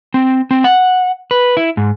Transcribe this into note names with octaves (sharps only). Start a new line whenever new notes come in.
C4
C4
F#5
B4
E4
G#2